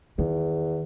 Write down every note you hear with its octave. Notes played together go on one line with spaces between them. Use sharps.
E2 D#3